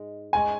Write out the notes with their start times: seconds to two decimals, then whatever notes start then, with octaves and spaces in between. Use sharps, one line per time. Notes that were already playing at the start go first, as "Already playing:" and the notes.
Already playing: G#2 G#3
0.33 G#2 G#3 C#4 G#5